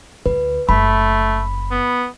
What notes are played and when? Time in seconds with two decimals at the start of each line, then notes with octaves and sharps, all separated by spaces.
0.26 D2 B4
0.69 F#1 A3 B5
1.71 B3